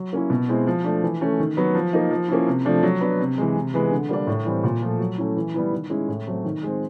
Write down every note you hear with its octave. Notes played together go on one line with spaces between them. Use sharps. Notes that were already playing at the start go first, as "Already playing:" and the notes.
Already playing: F#3
A#3 C#4 E4
B2
G#3 C4 E4
F3
A3 D4
E3
A3 C#4
D#3
F#3 B3
F3
A#3 D#4
F3
A#3 C#4 E4
C3
F3 A3 D4
F#3
B3 D4
C3
E3 G#3
C3
E3 G#3 B3
D3
G3 A#3 D4
A2
E3 G3 C4
A#2
F3 A3
F#3
A3 C#4 E4
E3
G3 B3 E4
D#3
G#3 C#4 E4
A2
F#3 A3 C4
D#3
G#3 C4